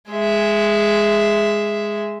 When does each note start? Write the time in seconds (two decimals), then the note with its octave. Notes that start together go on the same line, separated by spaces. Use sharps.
0.11 G#3 E5